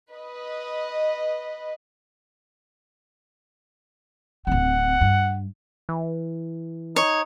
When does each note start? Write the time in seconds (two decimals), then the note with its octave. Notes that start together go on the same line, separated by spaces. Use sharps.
0.12 B4 D#5
4.47 D1 C4 F#5
5.01 G2
5.89 E3
6.96 D#4 C#5